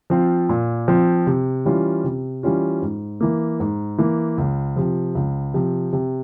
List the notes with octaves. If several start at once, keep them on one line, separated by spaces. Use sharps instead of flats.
F3 C4 F4
A#2
F3 C4 F4
C3
E3 G3 C#4 F4
C3
E3 G3 C#4 F4
G#2
E3 A#3
G#2
E3 A#3
C#2
C3 F3
C#2
C3 F3
C3